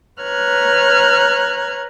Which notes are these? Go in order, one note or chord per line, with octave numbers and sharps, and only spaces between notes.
B4 C#5 A#5 F6 F#6 G#6